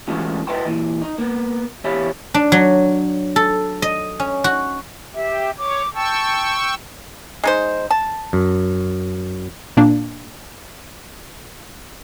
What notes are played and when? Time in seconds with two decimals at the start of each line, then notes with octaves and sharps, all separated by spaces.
0.08 E3 G#3 A3 C#4 F4 F#4
0.47 B4 D#5 E5 F#5 G5 C6
0.65 A#2 E3
1.02 D#4
1.18 A#3 B3
1.84 E2 G4 C#5 E5 F5 B5
2.34 D4
2.52 F#3
3.36 A4
3.82 D#5
4.20 C#4
4.44 F#4
5.15 G4 E5
5.58 C#5 D6
5.94 G5 A5 C#6 E6
7.44 G#3 D#4 C5
7.91 A5
8.33 F#2
9.77 A#2 A#3 D4